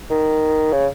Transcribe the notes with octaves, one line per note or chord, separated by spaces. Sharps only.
D#3
C#3